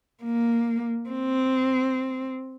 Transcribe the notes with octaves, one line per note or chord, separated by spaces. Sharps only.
A#3
C4